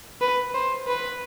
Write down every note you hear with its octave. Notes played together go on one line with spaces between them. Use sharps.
B4
C5
B4